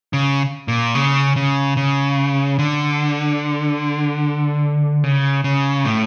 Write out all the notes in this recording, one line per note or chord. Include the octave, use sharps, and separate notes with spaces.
C#3
A#2
C#3
C#3
C#3
D3
C#3
C#3
A2